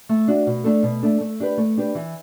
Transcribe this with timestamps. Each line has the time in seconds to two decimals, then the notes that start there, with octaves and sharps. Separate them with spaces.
0.09 A3
0.28 D4 F#4
0.47 B2
0.64 A3 D4 A4
0.83 B2
1.03 A3 D4 A4
1.21 A3
1.40 D4 G4 B4
1.58 A3
1.77 D4 G4 B4
1.95 E3